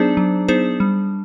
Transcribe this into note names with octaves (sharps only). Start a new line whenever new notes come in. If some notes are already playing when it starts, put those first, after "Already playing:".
Already playing: F#3 B3 D4 D#4 G#4 C5
F#3
B3 D#4 G#4 C5
G3